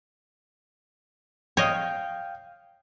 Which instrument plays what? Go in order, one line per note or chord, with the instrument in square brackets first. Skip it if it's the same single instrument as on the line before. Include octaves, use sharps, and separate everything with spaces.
[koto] C#5 D#5 [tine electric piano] F5 G5